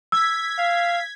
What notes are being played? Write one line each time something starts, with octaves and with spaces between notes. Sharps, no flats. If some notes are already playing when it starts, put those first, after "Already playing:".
E6 G#6 B6
F5